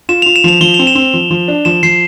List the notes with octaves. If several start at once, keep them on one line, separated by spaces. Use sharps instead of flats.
F4 E7
F4 F7
E7
F3 F7
F3 G7
F7
C4
E7
C4
F3
F3
D4
F3 E7
F3 C7